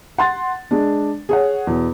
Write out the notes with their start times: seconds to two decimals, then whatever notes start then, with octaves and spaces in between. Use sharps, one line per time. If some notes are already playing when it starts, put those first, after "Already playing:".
0.18 F#5 C6 A6
0.71 G#3 D4
1.29 G#4 C#5 F#5
1.67 E2 B2